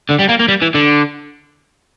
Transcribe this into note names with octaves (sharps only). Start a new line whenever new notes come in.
D3
G3
A#3
A#3
G3
E3
D3